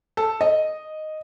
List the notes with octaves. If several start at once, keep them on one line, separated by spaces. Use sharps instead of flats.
A4
D#5